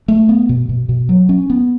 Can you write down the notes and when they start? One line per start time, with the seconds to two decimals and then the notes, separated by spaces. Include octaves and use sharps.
0.08 A3
0.29 B3
0.49 B2
0.69 B2
0.89 B2
1.09 F#3
1.29 C#4
1.50 B3